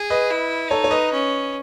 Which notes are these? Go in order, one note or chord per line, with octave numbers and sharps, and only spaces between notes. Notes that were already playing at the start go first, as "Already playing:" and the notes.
Already playing: G#4
B4 D#5
E4
D#4 A4 C#5
C#5
B4 D#5
C#4